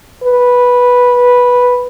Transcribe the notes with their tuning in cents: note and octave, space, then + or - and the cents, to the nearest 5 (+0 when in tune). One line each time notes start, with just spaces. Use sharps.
B4 -5